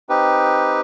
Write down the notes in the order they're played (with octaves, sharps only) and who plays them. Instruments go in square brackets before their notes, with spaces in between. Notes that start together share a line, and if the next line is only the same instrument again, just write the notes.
[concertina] C4 D#4 G4 B4